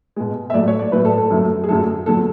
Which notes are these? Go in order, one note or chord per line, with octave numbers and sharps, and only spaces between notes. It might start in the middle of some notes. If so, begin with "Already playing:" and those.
B2 G#3
E5
A2 F#3 A3 D5
C#5
D5
A2 F#3 A3 B4
A4
A4
F#2 D3 F#3 A3
G#4
F#2 D3 F#3 A3 A4
E2 D3 F#3 A4